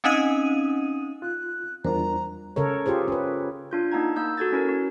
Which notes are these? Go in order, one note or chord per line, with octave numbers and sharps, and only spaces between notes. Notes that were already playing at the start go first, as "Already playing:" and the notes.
C4 C#4 D#4 D#5 D#6 D#7
F4 F#6
E2 G3 D4 F4 A#4 C5 A#5
C#3 A4 A#4 C#5
F4 G4 G#4 C5
C#4 B4
D4 F4 G6
A#3 D#4 F#5 A5 A#5 G#6
A#3 E6 G6
F#4 A4 G#6 A6
C#4 E4 A#4
F#4